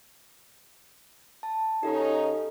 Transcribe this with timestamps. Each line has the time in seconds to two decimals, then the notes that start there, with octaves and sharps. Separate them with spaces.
1.43 A5
1.83 C#3 C#4 D#4 G4 A4